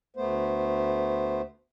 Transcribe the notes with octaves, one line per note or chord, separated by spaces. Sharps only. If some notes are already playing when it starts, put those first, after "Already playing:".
D2 A3 B3 C5